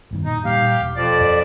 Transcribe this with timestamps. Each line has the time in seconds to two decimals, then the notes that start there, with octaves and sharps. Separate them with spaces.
0.11 E1 G2 D#3
0.25 A#2 D#4
0.45 A#2 G3 A#3 G4 F5
0.81 E1
0.96 F2 F3 D5
1.21 F#2